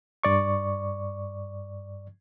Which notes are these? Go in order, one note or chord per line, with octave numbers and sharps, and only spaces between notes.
G2 D5 C#6